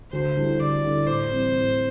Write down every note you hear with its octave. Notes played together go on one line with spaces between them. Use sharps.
D2 C5
D3 G3 E4 A4
D2 D5
D3 G3 E4 A4
A2 C5
E3 G3 C4 E4
A2